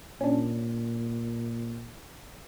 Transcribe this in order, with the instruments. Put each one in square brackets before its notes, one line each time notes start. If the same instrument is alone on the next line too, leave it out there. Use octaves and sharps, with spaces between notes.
[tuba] A#2 [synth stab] C#4 D4